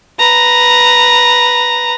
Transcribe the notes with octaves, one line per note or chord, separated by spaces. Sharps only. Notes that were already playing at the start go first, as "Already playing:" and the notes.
B4 A#5